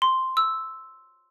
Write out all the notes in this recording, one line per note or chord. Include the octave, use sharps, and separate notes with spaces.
C6
E6